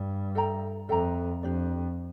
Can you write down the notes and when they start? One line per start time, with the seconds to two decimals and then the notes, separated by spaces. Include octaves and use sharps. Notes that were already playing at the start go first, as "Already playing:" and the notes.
Already playing: G2
0.35 A4 E5 G5 A#5
0.89 F2 A4 E5 G5 A#5
1.43 F2 D4 G4 D5